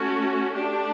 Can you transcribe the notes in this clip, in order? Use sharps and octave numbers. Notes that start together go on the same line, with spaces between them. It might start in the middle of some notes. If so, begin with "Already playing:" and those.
Already playing: A3 C#4 F#4
A3 D4 G4